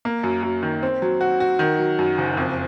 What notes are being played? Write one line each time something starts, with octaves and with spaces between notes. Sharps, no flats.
A#3
F#2
F#2
D#3
C4
F#3
F#4
F#4
D#3
F#3
F#2
F#1
F2